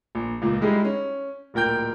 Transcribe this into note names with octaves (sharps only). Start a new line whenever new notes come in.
A#1
C#2 A#2
G3 G#3 D#4 E4 G#4
C#4
D1 A#2 A#4 G5 G6